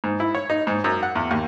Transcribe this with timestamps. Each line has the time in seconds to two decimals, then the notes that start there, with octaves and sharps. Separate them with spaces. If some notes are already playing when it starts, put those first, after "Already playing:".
0.04 G#2
0.20 E4
0.35 C#5
0.50 D#4
0.67 G#2
0.84 F#2
1.03 F#5
1.15 E2
1.31 D#2